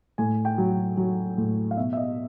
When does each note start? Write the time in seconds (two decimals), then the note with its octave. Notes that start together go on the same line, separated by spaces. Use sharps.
0.18 A2 G#5
0.45 G5
0.58 F#3
0.97 F#3
1.38 A2
1.71 F5
1.77 B2 E5
1.93 E5
1.97 D#5